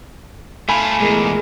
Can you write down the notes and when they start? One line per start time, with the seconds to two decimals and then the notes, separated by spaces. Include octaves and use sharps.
0.69 A3 F4 G#5 B5
1.00 E2 A#2 G#3 A3 A#4